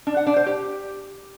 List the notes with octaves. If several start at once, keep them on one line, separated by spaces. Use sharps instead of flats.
D4
F#5
D4
C5
G4